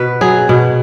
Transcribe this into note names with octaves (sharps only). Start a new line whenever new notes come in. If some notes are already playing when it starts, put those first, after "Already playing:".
Already playing: B2 B3 B4
F#3 G#4
B2